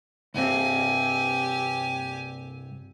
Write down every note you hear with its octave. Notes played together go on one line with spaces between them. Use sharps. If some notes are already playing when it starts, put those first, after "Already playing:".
C2 G2 C4 G4 G#5